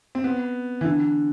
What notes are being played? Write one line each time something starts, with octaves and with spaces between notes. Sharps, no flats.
C4
B3
E3
D3